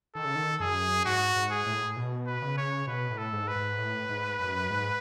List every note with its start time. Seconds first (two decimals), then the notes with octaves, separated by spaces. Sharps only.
0.14 D#3 A4
0.25 C#3
0.35 D#3
0.60 F#2 G#4
1.05 G#2 F#4
1.36 G#2
1.51 G#4
1.66 A2
1.96 B2
2.26 B4
2.42 C#3
2.57 C#5
2.87 B2 B4
3.10 A2
3.18 A4
3.33 G#2
3.48 B4
3.56 G#2
3.78 A2
4.09 G#2
4.40 F#2
4.70 G#2